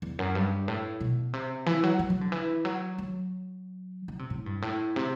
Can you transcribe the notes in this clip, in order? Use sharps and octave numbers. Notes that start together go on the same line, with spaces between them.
E2
F#2
G2
A2
B2
C3
E3
F#3
F#3
F#3
D3
E3
F#3
F#3
D3
C3
A2
G2
A2
C3